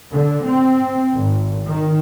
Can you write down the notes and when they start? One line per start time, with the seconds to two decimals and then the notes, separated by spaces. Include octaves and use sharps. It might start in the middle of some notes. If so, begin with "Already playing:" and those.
0.12 D3
0.45 C4
1.15 G#1
1.67 D#3